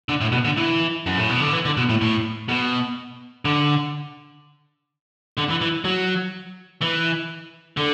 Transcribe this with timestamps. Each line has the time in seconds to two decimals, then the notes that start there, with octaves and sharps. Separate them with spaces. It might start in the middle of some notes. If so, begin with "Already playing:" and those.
0.09 D3
0.21 A2
0.32 B2
0.45 D3
0.57 E3
1.06 F#2
1.18 A2
1.29 B2
1.41 D3
1.53 E3
1.65 D3
1.77 B2
1.89 A2
2.01 A2
2.49 B2
3.45 D3
5.37 D3
5.49 E3
5.61 E3
5.85 F#3
6.82 E3
7.77 D3